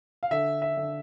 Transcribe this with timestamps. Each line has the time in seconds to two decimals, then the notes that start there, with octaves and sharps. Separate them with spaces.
0.23 F5
0.31 D3 E5
0.62 E5
0.77 D3